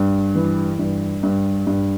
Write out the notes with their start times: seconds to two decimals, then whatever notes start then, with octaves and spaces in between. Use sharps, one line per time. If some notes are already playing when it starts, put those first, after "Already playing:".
Already playing: G2
0.35 E3
0.79 G2
1.23 G2
1.67 G2